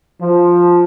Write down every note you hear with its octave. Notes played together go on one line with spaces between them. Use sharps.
F3